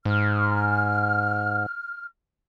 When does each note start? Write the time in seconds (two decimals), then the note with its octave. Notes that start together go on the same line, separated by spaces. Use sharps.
0.05 G#2 F6